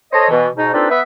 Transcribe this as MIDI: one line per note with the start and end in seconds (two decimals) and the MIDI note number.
0.12 0.27 69
0.12 0.27 72
0.12 0.27 73
0.12 0.27 75
0.30 0.46 47
0.30 0.46 52
0.56 0.69 44
0.56 0.69 47
0.56 0.69 63
0.73 0.88 60
0.73 0.88 62
0.73 0.88 63
0.73 0.88 65
0.73 0.88 69
0.73 0.88 71
0.89 1.00 59
0.89 1.00 71
0.89 1.00 76